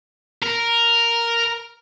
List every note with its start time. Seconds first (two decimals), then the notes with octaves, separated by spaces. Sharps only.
0.43 A#4